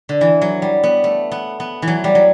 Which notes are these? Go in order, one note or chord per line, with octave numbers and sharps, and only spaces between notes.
D3
E3
F#3
G3
B3
A3
B3
B3
E3
F#3
G3
F#3